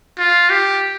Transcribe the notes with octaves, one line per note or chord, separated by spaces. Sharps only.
F4
G4